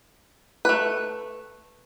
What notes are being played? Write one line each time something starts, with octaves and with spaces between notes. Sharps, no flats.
A3 B4